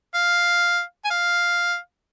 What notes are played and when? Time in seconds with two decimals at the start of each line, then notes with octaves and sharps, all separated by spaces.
0.15 F5
1.05 G#5
1.10 F5